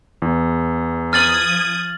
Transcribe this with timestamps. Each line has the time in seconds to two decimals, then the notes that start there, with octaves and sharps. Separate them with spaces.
0.22 E2
1.13 F3 D#6 F6 G#6 A6 F#7